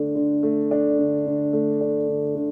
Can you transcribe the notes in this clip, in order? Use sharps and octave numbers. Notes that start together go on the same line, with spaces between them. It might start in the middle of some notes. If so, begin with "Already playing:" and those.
Already playing: D3 A3 D4
D3
A3
D4
D3
D3
A3
D4
D3
D3